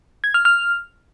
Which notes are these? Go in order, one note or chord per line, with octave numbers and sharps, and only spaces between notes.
G#6
F6
F6